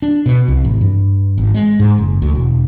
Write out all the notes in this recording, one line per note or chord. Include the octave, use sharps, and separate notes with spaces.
D4
B2
C2
A1
G2
G#1
G#3
G#2
F#1
D2
E1